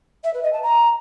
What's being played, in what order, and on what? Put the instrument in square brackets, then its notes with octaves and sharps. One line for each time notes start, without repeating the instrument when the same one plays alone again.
[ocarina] E5
B4
D#5
A5
A#5